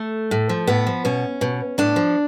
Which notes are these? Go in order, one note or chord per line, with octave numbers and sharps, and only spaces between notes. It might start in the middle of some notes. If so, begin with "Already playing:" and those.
Already playing: A3
A2
F3
A2 B3
F3
B2 C#4
B2
A2 D4
F3